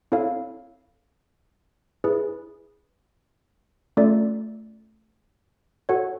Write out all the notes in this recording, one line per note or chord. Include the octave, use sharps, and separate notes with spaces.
C4 E4 A4 C#5 F5
E4 G#4 B4
A3 C#4 F4 A4 D5
F#4 A4 C#5 F#5